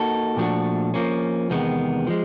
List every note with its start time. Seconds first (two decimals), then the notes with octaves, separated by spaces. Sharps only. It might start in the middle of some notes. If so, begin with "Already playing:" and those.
Already playing: A#3 D#4 F#4 A4
0.36 A#2 F3 A3 D4 F#4
0.94 F3 A#3 C#4
1.50 E2 C3 D#3 G#3 B3
2.07 F3 G#3